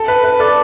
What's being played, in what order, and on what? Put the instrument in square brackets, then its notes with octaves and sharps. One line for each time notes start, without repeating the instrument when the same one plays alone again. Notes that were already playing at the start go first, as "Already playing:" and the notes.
Already playing: [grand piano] A4
B4
B4
[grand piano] A4 [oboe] D5